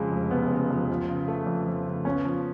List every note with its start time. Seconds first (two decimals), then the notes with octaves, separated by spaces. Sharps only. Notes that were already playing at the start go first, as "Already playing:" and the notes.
Already playing: F2 C#3 G#3
0.12 F1
0.31 F1 B3
0.50 C#3
0.70 F2
0.90 F3
1.09 C#3
1.28 A3
1.47 F2
1.66 F3
1.86 C#3
2.05 B3 C#4
2.25 F3